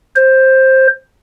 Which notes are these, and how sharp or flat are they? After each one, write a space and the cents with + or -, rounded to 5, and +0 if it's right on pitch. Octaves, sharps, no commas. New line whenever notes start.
C5 +10